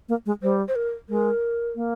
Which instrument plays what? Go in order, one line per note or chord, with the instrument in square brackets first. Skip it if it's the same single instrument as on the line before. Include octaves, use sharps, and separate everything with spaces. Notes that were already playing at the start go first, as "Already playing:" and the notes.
[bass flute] A#3
G#3
[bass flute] G3 [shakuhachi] C5
[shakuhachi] C5
A#4
[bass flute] G#3 [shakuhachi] A#4
[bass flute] A#3